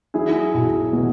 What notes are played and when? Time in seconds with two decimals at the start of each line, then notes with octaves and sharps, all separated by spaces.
0.14 F#3 E4 G#4
0.54 B1
0.93 B2